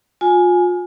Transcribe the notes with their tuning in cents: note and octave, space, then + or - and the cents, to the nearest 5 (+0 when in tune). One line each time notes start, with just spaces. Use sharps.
F4 +30 G#5 +5